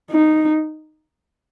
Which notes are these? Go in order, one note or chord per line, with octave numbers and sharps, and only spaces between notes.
D#4